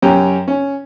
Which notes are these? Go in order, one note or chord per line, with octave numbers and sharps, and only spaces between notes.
F#2 C#4 G4 G5 A#5
C#4